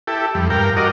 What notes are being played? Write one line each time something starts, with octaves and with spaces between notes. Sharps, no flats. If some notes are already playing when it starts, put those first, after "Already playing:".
E4 G4 A4
F2 G3
G2 A#4 F5 G5
F4 F#4 A#4 D5 D#5